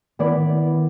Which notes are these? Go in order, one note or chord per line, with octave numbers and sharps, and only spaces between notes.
D#3 B3 E4 D5